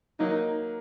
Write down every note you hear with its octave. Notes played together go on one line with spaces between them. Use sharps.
F#3 A#3 D#4